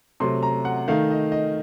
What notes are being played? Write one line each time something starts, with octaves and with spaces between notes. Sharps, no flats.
C3 F#3 A3 C6
A#5
F#5
D#3 A3 D#4 F5
D#5
D#5